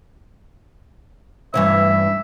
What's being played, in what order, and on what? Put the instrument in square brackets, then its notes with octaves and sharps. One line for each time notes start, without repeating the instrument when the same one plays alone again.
[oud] G2 E3 C#4 [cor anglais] E5